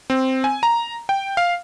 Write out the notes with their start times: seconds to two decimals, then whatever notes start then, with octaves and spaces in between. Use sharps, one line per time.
0.10 C4
0.44 G#5
0.63 A#5
1.09 G5
1.37 F5